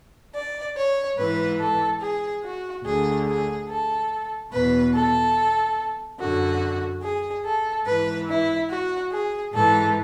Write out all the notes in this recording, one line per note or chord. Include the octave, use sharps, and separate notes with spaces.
D5
C#5
G#2 E3 B4
A4
G#4
F#4
D2 D3 G#4
G#4
A4
E2 B2 B4
A4
F#2 D3 F#4
G#4
A4
G#2 E3 B4
E4
F#4
G#4
G#2 E3 A4